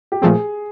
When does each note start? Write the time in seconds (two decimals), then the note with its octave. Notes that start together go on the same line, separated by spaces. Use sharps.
0.12 G4
0.22 A#2 F3 A3 C4 G#4